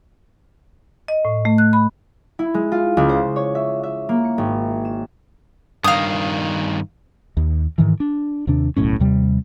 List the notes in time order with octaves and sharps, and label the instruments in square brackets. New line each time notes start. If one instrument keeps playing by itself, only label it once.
[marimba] D#5
A2
A3
F#6
B5
[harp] E4
G#3
F4
C#2
C5
C#5
E5
E5
A#3
C#7
G#1
E7
[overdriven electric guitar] G2 D#3 [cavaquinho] F5 D#6
[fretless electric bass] D#2
G#2 D#3 E3
D4
D#2 C3 D4
D1 B1 A2 C#4
D#2 C3 G3